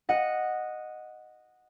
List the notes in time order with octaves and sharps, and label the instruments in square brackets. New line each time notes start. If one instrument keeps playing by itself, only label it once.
[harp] D#5 F#5